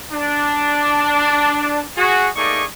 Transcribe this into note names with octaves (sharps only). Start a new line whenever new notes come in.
D4
F#4 G#4
A3 A#3 D#4 G#4 D5 C#6